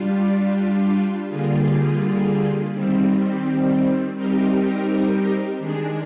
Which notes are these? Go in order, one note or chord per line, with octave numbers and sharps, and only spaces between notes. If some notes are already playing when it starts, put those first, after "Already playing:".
Already playing: G3 D4 F4
D3 G3 A#3 F4 G#4
D#3 G3 C4
G3 C4 D#4 G4 A#4
D#3 G#3 D4 G#4